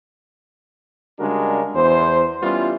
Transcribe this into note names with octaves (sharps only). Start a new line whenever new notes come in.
C#3 G3 G#3 D4 F#4 A#4
E2 C5
G3 B3 C#4 E4 F4